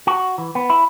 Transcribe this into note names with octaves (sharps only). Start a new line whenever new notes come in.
F#4
E3
B3
E4